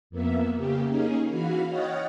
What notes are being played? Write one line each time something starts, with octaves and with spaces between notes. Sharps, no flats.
F2 A#3 B3 E5
C#3 A#3 G4
A#3 C#4 D#4 G#4
E3 F#4 F5 B5 F6
C#5 D#5 F#5 G5 F6 A6